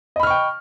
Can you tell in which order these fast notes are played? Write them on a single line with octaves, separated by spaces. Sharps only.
D#5 B5 F6 C#6 G5